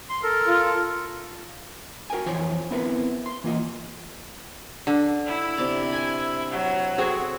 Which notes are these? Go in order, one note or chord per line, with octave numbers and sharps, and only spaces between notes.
C6
A4 A#4
F4
F#4 A#4 G5 G#5
F2 E3 F4 C5 C#5 G#5
B3 C4 E4 A#4 B4
C6
E3 A#3 F4 D#5
D3
E4
C3 D5 A#5
G#5
F#3
C4 F#4 G#4 A4